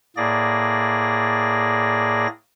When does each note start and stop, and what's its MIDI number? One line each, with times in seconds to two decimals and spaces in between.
0.17 2.27 45
0.17 2.27 58
0.17 2.27 68
0.17 2.27 74
0.17 2.27 94